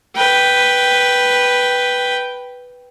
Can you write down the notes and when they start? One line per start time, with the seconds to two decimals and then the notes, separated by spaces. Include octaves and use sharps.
0.16 B4 G5